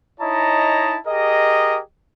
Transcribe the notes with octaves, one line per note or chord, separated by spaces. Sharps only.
D#4 E4 C#5 D#5 A5 A#5
G4 G#4 A#4 D#5